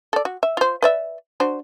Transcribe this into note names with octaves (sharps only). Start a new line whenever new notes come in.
A4 D5
F#4
E5
F4 C5
B4 D5 E5
D4 F#4 C5